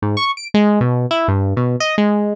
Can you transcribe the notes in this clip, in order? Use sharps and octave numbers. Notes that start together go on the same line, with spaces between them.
G#2
C#6
D7
G#3
B2
E4
G2
B2
D#5
G#3